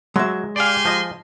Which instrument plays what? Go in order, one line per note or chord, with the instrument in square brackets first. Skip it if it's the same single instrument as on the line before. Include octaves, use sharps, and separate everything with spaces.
[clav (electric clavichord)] F#3 [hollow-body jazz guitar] G#3 E5
[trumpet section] G4 G#5 C6 [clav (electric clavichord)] D5 F5
[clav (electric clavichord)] F3 D#5